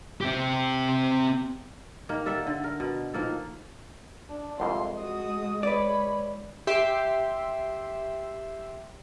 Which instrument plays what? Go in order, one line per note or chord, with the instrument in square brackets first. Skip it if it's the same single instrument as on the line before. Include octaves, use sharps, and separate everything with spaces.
[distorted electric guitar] C4 G4
[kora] D#3 A#3
G3 A4 E5 F#5
D3
A#4
B2
D#3 F3 A#3 A4
[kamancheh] D4
[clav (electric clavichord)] C2 F2 [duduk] G#3 [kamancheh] C6
[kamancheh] F#4 D#6
[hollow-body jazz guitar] B4 D5 [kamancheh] C#5 B5
[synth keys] G4 E5 C6